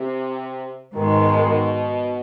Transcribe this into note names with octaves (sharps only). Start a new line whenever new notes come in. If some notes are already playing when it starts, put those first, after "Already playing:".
Already playing: C3
G#2 B2 D#3 G#3